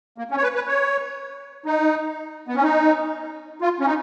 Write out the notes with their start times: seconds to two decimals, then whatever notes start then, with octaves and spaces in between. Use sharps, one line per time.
0.18 A#3
0.31 C#4
0.37 C#5
0.43 B4
0.55 B4
0.68 C#5
1.66 D#4
2.48 B3
2.56 C#4
2.63 D#4
3.62 F4
3.80 C#4
3.86 D#4